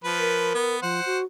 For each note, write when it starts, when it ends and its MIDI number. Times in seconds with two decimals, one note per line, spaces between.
0.04 0.54 53
0.04 0.54 71
0.19 0.77 70
0.54 0.79 59
0.82 1.01 53
0.82 1.19 72
0.82 1.19 78
1.06 1.24 66